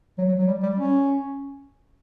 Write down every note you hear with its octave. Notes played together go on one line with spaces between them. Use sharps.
F#3
F#3
F#3
G3
G3
C#4